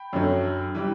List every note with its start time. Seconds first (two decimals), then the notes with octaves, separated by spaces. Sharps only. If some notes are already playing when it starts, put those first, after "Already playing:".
Already playing: G5 B5
0.13 F#2 D3 F#3
0.75 E3 G3